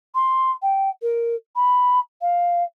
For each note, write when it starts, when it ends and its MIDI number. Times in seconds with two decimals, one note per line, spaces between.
0.15 0.51 84
0.62 0.89 79
1.02 1.35 70
1.56 1.99 83
2.22 2.64 77